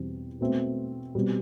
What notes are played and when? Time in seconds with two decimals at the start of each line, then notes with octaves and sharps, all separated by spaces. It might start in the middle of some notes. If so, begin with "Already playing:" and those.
Already playing: E2 B2 G3 C4
0.41 B2 A3 C4
1.15 B2 G3 C4